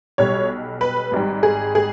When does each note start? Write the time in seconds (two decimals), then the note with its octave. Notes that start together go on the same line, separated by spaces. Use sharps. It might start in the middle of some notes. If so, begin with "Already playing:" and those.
0.18 B1 B2 G3 C#5
0.81 B4
1.12 G#1 G#2 G3
1.43 G#4
1.75 G#4